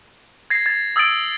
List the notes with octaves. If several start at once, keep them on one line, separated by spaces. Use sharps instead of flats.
G#6 A#6 C7
G#6 A6
D#6 E6 G#6 A6 D7 F#7